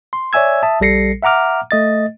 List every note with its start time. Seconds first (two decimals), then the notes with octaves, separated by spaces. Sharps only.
0.13 C6
0.33 C#5 D5 E5 G#5 E6 G#6
0.63 E5 A5 D#6
0.81 A#1 G3 A4 A#6 C7 C#7
1.23 E5 F#5 A#5 D6 F6
1.71 A3 D#5 A6